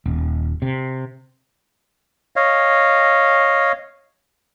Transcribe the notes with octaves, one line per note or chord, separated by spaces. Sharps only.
D#1
C3
C#5 D#5 F5